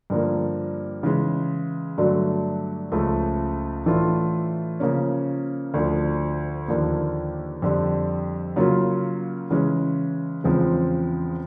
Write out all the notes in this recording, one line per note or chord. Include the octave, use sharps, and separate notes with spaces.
G2 D3 F3 A#3
C#3 E3 G#3
G2 D3 F#3 A3
C#2 C#3 F3 A3
A2 E3 A3 D4 F4
C#3 F3 A#3 C#4
D2 D3 F3
D#2 D3 F3 A#3
F2 D3 G3
C#3 F#3 A#3 C#4 F4
C#3 E3 G#3 C#4
E2 C#3 F3 G#3 C4